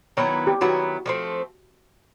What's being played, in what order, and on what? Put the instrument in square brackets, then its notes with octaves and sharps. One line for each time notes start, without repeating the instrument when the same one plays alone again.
[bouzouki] D#3 F#3 B3 E4 [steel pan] C#5
[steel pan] G4
[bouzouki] D#3 F#3 B3 E4 [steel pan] F#4
[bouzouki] F3 A3 C4